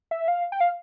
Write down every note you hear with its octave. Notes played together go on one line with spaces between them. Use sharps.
E5
F5
G5
F5